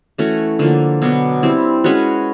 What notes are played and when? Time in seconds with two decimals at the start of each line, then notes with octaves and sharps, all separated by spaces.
0.18 E3 A3 C#4 F#4
0.59 D3 F3 A#3
1.02 B2 F#3 B3 D4
1.43 G3 C4 E4
1.84 G#3 C#4 F#4 B4